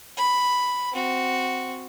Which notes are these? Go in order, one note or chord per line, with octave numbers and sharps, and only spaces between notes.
B5
C4 F#4